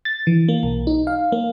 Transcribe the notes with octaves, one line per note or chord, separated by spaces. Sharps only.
A6
E3
A#3
B1
D#4
F5
A#3